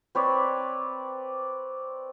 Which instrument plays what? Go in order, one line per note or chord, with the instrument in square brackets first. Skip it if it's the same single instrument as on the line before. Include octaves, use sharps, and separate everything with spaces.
[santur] C4 B4 C#5 D5